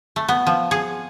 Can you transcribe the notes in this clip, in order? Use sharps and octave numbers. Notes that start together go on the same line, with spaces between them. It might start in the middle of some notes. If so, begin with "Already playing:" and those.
A3
B3
F3
G#4